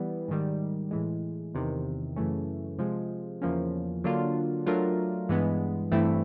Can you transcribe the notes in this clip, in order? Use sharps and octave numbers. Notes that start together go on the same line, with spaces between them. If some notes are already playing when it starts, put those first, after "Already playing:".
Already playing: E3 G3 B3
G#2 D#3 G3
A2 E3 G#3
E2 C3 D#3
F#2 C#3 E3 A3 C#4
C3 F3 G#3
E2 C#3 F3 A#3 C#4
D3 F#3 A#3 D4 F4
F#3 A3 D4 F4 A#4
G2 E3 G#3 B3
G2 E3 A3 C4 E4